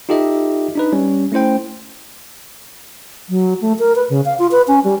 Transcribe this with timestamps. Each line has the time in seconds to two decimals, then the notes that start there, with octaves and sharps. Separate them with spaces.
0.09 D#4 F4 G4 A4 D#5 E5
0.75 D4 D#4 B4
0.93 G3 C#4
1.32 A3 C#4 E4 C5 G5
3.29 F#3
3.61 A3
3.79 A#4
3.96 B4
4.09 C#3
4.25 F5
4.39 F4
4.51 B4
4.68 C#4
4.84 G3